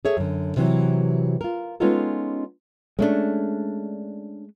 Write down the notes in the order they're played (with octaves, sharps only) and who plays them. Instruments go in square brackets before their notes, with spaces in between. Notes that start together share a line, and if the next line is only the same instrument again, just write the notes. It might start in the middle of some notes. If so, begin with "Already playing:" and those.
[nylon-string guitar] G#4 A4 C#5 E5
F#2 D3
C3 E3 F#3
F4 A#4
G#3 B3 C#4 D#4 F4 A4
[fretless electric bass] G#3 A3 [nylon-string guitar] C#4 D4